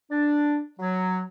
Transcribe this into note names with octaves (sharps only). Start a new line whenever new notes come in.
D4
F#3